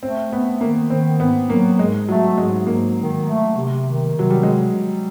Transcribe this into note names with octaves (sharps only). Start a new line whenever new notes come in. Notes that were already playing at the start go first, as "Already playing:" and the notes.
A3 C4
A3 B3
D#3 A#3
D#3 C4
G#2 B3
F#3 A#3
G#2 G#3
F#3 A3
G#2 G#3
G#2 A#3
D#3
A3
C3
D#3
C3 F#3
G3
G#3